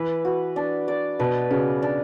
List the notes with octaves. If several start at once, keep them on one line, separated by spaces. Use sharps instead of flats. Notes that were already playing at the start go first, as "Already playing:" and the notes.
Already playing: E3 B4
F#4
D4
D5
B2 B4
C#3 F#4
D4